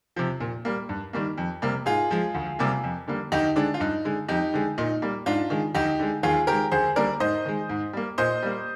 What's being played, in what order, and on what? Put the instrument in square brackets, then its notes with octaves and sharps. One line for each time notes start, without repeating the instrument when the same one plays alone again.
[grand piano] C3 F3
A#2
G3 A#3
G2
D#3 G3 A#3
F2
C3 G3 A#3
G#2 F4 G#4
F3 G#3
D2
C3 G3 A#3
F2
D3 G3 A#3
D2 D#4 G4
D3 G#3 D4
F4
G2 D#4
D3 G#3
F2 D#4 G4
D3 G#3
A#2 D#4
G3 A#3
G#2 D4 F4
D#3 G#3
D2 D#4 G4
D3 G#3
D#2 F4 G#4
D#3 G#3 G4 A#4
D2 G#4 C5
D3 G3 A#3 A#4 D5
G#2 C5 D#5
D#3 G#3
G#2
G3 A#3
A#2 C5 D#5
G3 A#3